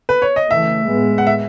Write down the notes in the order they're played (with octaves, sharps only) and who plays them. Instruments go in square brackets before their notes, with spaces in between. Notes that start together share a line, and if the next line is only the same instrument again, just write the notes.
[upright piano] B4
C#5
D#5
[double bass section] C#3 E3 A3 [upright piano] E5
[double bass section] A2 G#3 B3
[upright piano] F#5
E5